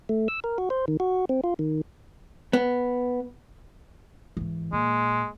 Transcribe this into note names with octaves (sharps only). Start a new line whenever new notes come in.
A3
E6
A#4
F#4
C5
D#3
F#4
C4
F4
D#3
B3
G#2 E3
A#2 G#3